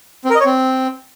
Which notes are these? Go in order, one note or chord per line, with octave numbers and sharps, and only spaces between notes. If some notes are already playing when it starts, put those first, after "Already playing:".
C4
A#4
D#5
C#5
C4